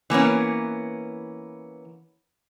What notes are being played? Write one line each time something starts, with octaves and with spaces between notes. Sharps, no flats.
E3 A#3 B3 C#4